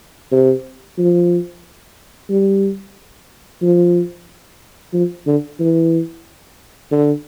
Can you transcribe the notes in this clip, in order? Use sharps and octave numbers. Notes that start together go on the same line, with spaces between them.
C3
F3
G3
F3
F3
D3
E3
D3